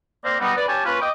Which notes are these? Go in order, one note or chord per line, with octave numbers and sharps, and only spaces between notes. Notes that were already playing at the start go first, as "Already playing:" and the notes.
A#3 C4 C5 D5 F5 A#5
G3 B3 D#4
B4 D5
C#4 G4 G#5 A5
A#3 C#4 F4 B4
D#5 G5 D6